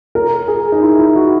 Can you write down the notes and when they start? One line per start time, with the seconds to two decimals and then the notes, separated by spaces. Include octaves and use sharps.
0.15 A#4
0.48 G#4
0.72 D#4
0.82 E4
0.98 E4
1.16 F#4